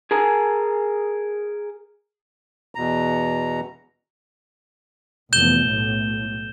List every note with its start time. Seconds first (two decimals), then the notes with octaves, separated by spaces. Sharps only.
0.11 G#4 A#4 G#5
2.75 E2 B2 A#5
5.33 F1 E2 G6 E7 G7
5.66 B1 A2